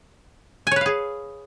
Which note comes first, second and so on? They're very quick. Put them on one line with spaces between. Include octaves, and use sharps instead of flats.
G#5 C#5 B4 F5 G#4